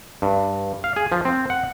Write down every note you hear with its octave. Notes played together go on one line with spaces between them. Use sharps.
G2
F5
G#4
F3
C4
F#5